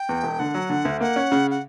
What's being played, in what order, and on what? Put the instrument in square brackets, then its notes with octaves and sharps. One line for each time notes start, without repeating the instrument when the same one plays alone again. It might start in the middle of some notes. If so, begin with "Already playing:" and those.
Already playing: [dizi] G5
[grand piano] E2
E1
[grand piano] D3 [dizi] F#5
[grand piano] F#3
D3
D2
[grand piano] A#3 [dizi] F#5
[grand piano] C#4
C#3
[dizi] F#5